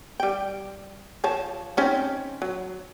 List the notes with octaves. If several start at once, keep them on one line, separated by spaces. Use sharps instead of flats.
G3 G5
F3 C#5 A5
C4 C#4 D#4
F#3